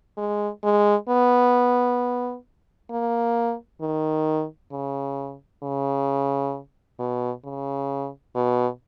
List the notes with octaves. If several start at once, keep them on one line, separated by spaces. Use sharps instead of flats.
G#3
G#3
B3
A#3
D#3
C#3
C#3
B2
C#3
B2